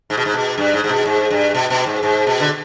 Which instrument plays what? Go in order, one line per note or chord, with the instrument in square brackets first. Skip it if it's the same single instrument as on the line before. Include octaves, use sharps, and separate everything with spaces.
[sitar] G#2
B2
G#2
B2
G2
G#2
G#2
B2
G#2
G2
B2
B2
G#2
G#2
B2
D3